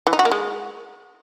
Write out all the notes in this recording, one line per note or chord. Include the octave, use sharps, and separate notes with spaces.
E3
D#4
F#4
A#3
G#3